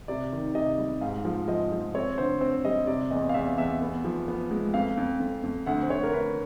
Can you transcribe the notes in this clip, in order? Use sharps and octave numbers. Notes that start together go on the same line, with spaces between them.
C3 D5
D#3
C3 D#5
G3
G#2 F5
F3
F3 D#5
F3
C4 C#5
D3 C5
C4 C5
G3 D#5
C3 D5
E2 D#5
F5
E2 E5
E2 E5
B3
F3
B3
G#3
F2 F5
F2
F2
F2
D2 F#5
C5
D2 C#5
A#4
D2 B4